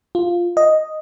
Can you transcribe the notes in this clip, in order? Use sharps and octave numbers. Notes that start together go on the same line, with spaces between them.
F4
D#5